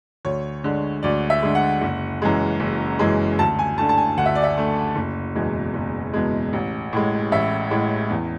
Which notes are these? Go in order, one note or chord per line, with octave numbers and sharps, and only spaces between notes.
D2 C#5
D3 G#3
D2 D5
E5
D3 G#3
F#5
F#1
F#2 E3 G#3
F#1
F#2 E3 G#3
D2 A5
G#5
D3 A3 A5
A5
G#5
D2 F#5
E5
D5
E5
D3 A3
F#1
E2 B2 G#3
F#1
E2 B2 G#3
A1
A2 G#3
A1 E5
A2 G#3
E2